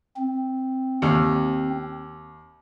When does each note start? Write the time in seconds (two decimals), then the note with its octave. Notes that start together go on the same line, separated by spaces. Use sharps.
0.17 C4
1.02 D#2